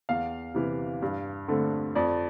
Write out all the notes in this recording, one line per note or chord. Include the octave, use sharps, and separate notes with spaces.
E2 F5
C3 E3
G2
D3 A3 C4
F2 D5